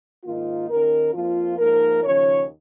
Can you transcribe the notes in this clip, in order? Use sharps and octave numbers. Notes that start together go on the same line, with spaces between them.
G#2 D#3 A#3 D#4 F4
D#2 D#3 C#4 A#4
F2 F3 A#3 F4
G#2 F3 A#3 D#4 A#4
D#2 C#3 F3 C#4 C#5